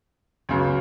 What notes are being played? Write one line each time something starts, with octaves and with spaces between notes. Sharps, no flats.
C#2 C#3 F#3